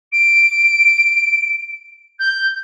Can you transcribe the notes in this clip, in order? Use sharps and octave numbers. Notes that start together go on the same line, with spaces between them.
D7
G6